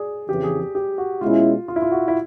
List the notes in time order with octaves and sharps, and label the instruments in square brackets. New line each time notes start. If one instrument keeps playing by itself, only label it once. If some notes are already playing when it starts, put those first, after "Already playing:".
Already playing: [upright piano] G#4 D5
[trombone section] F2 C#3 E3 [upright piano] G4
[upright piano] G#4
G#4
G4
F#4
[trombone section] B2 G#3 C#4 E4 [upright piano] F4
[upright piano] F4
E4
F4
F#4
E4